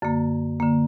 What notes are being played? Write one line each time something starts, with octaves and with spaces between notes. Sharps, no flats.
F#2 D3 A#3
D3 A#3